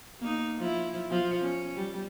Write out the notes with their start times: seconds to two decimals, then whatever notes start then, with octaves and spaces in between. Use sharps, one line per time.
0.20 A#3 D#4
0.59 F3 E4
1.10 F3
1.40 C#4
1.76 G3